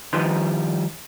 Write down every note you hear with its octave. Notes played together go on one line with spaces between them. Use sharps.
D#3 F3 G3 D#4 B4 C6